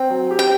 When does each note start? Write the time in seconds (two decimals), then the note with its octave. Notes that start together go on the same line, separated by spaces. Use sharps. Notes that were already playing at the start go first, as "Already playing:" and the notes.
Already playing: C4 G5
0.10 F#3
0.31 G4
0.39 G5